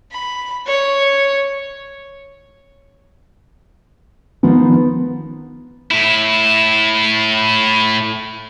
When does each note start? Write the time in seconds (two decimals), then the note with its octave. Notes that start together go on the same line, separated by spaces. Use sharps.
0.12 B5
0.67 C#5
4.43 D#3 F3 G#3 B3
5.91 A2 E4